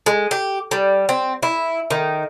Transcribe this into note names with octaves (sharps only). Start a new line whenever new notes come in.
G#3
G4
G3
C4
E4
D#3